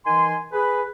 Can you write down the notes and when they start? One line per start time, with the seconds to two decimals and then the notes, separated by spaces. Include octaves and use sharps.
0.05 D#3 E3 G#5 C6
0.52 G#4 B4